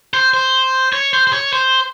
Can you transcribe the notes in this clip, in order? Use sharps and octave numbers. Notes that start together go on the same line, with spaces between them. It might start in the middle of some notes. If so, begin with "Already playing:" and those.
C5
C5
C#5
C5
C5
C#5
C5